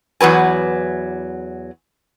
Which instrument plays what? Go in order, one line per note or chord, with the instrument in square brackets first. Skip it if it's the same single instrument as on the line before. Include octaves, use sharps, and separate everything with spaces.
[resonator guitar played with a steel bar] E2 F#3 B4 G#5